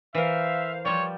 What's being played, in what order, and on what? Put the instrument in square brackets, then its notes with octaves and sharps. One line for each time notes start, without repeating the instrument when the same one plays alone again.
[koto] E3 A#4 [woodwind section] C5 F5 [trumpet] E5
[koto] F3 G3 [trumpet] C#5